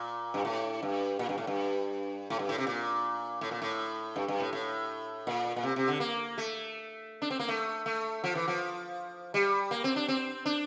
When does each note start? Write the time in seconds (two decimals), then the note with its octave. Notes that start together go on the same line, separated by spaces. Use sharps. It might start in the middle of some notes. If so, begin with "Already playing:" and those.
Already playing: A#2
0.34 G2
0.45 A2
0.83 G2
1.19 A#2
1.29 G2
1.38 A2
1.47 G2
2.30 A2
2.39 G2
2.49 A2
2.58 C3
2.67 A#2
3.41 A2
3.51 A#2
3.62 A2
4.16 G2
4.28 G2
4.40 A2
4.53 A2
5.27 A#2
5.56 A#2
5.63 C3
5.76 C3
5.88 D3
6.00 A#3
6.38 A3
7.22 D4
7.30 C4
7.39 A#3
7.49 A3
7.86 A3
8.24 F3
8.35 E3
8.48 F3
9.34 G3
9.71 A#3
9.84 C4
9.96 D4
10.08 C4
10.46 D4